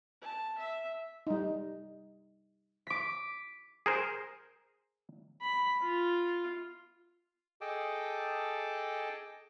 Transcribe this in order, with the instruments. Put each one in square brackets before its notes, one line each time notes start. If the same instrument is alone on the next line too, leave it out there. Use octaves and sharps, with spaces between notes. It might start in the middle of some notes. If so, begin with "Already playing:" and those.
[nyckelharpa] A5
E5
[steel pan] G3 D#4
[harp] D6 B6
[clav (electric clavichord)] G#4 A#4 C5
[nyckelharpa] B5
F4
[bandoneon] G#4 A4 D#5 G5 A5 D6